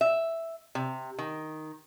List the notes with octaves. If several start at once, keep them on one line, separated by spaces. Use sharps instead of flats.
E5
C3
D#3